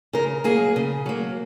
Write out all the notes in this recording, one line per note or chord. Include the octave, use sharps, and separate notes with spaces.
C#3 A#4
F#3 A#3 G#4
C#3
F#3 A#3